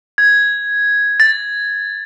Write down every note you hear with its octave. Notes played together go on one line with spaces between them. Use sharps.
G#6
A6